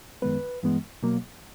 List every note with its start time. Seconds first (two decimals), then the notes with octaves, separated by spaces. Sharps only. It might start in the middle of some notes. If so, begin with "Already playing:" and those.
0.22 F#2 D#3 G#3 B3 B4
0.63 G2 E3 G#3 B3
1.03 B2 F#3 A#3